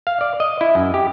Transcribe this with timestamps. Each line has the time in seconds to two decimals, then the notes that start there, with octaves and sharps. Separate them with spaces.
0.07 F5
0.21 D5
0.40 D#5
0.61 E4
0.75 F#2
0.94 G4